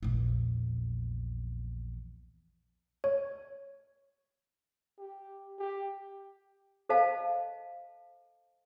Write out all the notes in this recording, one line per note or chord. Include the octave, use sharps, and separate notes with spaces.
A#1 E2
C#5
G4
G4
A4 C5 D#5 F5 A5